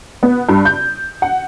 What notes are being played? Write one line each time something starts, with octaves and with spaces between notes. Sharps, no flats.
B3
G2
G6
F#5